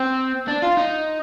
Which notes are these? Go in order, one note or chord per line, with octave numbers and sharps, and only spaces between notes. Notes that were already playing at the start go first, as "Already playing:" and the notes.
Already playing: C4
D4
F4
D#4